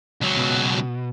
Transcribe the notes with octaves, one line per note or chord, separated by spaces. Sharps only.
C#2 F#3
B2